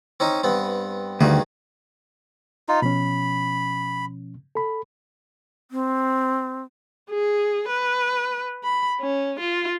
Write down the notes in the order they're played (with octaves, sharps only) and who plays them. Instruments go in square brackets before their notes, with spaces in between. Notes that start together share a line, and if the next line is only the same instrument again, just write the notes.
[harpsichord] C4 C#4 D#4
G2 B3 C4
[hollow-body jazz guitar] D2 [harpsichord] G2 D#3 G#4
[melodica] D#4 F4
[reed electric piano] B2 F3 C#4 [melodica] B5
[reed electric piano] A4 B5
[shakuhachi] C4
[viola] G#4
B4
B5
C#4
F4